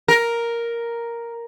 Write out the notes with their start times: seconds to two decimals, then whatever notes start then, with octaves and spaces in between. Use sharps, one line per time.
0.08 A#4